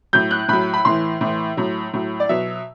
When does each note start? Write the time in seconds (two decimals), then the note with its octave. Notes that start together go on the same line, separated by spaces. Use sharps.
0.13 A2 F#3 G6
0.31 F#6
0.48 A2 F#3 B5
0.74 B5
0.85 A2 E3 C6
1.21 A2 E3
1.57 A2 F#3
1.93 A2 F#3
2.20 D5
2.29 B2 F#3 E5